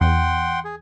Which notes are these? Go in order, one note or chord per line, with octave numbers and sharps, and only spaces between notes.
E2 F#5 G5 C6
G#4